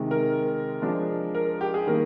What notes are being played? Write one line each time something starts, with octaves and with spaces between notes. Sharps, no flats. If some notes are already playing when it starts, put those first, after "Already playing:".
Already playing: C3 D#3 G#3
A#4
F3 G#3 D4
A#4
G4
G#4
D#3 G3 A#3 A#4